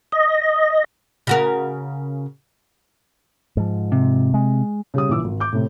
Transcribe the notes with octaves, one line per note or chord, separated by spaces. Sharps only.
D#5
C#3 F#4 A#4
G#2 F3
C3
G#3
C#3 G3 D#6
A#1 E3 D6 E6
G#1
D6 G6
A2 C3